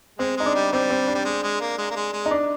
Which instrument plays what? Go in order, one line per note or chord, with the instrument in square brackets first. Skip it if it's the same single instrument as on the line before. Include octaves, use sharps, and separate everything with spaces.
[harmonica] G#3 [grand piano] C4
[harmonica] G#3 [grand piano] D#4
[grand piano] D4
[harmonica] G3
[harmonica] G3 [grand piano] C4
[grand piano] C4
D4
[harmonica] G3
G#3
G#3
A#3
G#3
A#3
G#3
G#3
[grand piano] D#4
D4